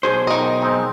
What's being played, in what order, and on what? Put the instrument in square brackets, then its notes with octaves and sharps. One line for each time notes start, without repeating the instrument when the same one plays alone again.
[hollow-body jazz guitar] B1 G#4 C5
[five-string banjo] D#3 D#5 [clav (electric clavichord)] A#4
[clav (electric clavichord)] G#3 C4 D#4